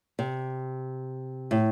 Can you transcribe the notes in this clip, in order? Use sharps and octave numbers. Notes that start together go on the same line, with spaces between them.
C3
A2